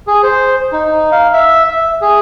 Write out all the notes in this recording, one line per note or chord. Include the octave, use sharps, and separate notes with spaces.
G#4
C5
D#4
F5
E5
E5
G#4